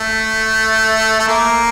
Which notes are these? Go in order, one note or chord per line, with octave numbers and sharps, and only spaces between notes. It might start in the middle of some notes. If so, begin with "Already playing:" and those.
Already playing: A3
A3
A#3